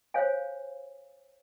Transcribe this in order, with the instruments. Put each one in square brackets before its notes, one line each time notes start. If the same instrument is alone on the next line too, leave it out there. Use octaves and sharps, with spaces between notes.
[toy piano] C5 C#5 F5 G#5